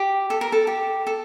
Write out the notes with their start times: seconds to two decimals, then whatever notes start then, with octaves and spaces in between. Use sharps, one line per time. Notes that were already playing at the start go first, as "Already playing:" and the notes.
Already playing: G4
0.30 A4
0.41 A#4
0.52 A4
0.67 G4
1.07 A4